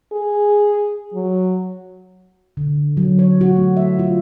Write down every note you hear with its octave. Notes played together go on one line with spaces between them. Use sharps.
G#4
F#3
D3
F#3
C#5
F#4
A3
E5
F4